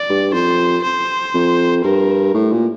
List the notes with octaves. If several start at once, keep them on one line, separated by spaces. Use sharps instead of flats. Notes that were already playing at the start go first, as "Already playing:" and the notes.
Already playing: D5
G2
F2 C5
C5
F2
G2 A#4
A2
A#2